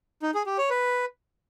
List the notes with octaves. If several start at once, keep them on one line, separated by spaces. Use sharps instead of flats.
D#4
G#4
G4
C#5
B4